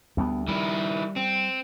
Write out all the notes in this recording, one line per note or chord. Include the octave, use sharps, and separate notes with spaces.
D2 G3 B3
D#3 G3 E4
C4